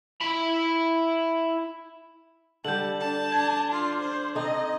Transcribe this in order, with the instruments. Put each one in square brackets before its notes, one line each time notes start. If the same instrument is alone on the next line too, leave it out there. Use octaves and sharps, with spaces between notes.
[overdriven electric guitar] E4 B5
[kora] D3 G3 [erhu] A5 [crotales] G6 F#7
[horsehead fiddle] D4 [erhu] A5
[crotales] G#6
[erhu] F4
C5
[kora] C4 D#4 A4 [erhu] D#5